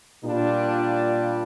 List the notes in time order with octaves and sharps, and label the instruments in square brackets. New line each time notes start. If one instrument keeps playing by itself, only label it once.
[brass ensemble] A#2 G3 D4 F4